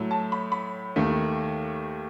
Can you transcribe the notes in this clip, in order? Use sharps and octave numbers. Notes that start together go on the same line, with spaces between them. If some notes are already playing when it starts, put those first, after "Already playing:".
Already playing: A2 F#3 A3
A5
B5
B5
D#2 D#3 A3